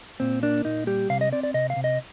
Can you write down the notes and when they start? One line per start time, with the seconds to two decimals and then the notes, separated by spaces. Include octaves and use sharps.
0.20 A#2 C4
0.43 A#3 D4
0.65 A#2 D#4
0.87 G3 G4
1.10 C3 F5
1.21 D#5
1.32 C4 D5
1.43 D5
1.54 C3 D#5
1.70 F5
1.76 C3
1.84 D#5